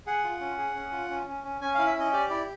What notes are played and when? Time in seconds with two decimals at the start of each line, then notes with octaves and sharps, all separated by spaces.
0.07 G#4 F#5
0.24 F4
0.41 C#4
0.58 G#4
0.75 C#4
0.92 F4
1.10 C#4
1.27 C#4
1.44 C#4
1.61 C#4 G#5
1.74 E4 F5
1.87 E5
1.95 C#4 D#5
2.13 G4 D5
2.30 E4 D5